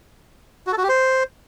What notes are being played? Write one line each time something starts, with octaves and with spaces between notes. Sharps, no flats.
F#4
A4
F#4
G4
C5